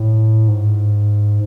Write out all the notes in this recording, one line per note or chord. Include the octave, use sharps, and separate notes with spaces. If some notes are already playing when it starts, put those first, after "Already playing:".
Already playing: A2
G#2